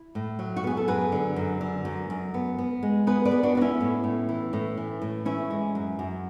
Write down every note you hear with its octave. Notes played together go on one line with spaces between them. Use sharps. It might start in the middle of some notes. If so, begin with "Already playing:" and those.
Already playing: E4
A2
F#3
F#4
B3 G#4
A4
F#2 G#4 B4
D3
F#2
D3
F#2
F#2
B3
B3
G#3
B3 G#4 B4
B4 D5
B3
D4 F#4
B3 F#4
C#4 E4
A2
A2
E3
A2
E3
A2
E3 C#4 E4
G#3
F#2
F#2